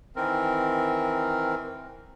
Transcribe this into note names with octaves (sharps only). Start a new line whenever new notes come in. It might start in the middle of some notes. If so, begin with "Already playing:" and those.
D#3 E3 C4 A#4